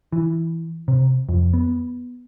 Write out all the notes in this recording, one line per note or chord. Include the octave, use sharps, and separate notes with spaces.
E3
C3
F2
B3